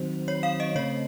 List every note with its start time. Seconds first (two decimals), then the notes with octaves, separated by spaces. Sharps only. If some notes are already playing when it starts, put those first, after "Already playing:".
Already playing: D#3 F#3 C4 C5
0.28 C#5
0.43 F5
0.60 D#5
0.75 C#3 A3 C4 C#5